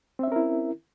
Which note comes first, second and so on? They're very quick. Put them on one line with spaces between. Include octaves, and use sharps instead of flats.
C4 E5 C#4 A#4 E4